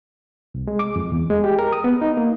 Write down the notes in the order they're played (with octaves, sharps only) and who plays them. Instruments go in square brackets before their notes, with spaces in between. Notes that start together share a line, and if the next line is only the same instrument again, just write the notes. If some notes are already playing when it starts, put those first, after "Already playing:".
[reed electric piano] C2
G#3
D6
F2
E2
G#3
G4
A#4
D#6
B3
D#4
A#3